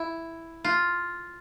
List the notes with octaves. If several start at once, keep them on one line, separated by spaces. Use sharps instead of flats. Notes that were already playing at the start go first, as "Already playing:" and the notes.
Already playing: E4
F4